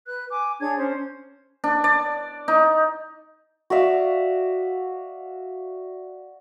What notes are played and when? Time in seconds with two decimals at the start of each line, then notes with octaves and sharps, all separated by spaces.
0.06 B4 F#6
0.29 G#5 D6
0.60 D4 G#4 C#5 G#6
0.77 C#4 C5
1.64 D4
1.84 D5
2.48 D#4
3.70 F#4 D5 E5 F5